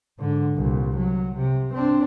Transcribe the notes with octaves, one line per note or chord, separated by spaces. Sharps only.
G#2 D3
C2 A#2
F#3
C3
C4 D4